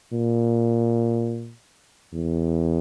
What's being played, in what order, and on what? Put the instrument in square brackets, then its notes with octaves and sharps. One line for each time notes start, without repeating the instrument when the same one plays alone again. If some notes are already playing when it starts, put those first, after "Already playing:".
[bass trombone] A#2
E2